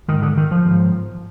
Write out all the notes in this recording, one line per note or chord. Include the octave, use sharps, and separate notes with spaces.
G#2 D#3
D3
D#3
F3
G#2